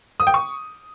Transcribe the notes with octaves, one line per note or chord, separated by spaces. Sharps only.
D#6
G5
C#6